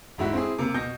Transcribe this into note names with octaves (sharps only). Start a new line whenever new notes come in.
E1 G#2 E4 F#4
C4 E4 G#4
C3 A#3
B2 G6 A#6